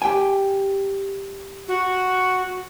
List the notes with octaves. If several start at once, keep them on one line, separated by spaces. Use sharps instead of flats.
G4 G5 G#5
F#4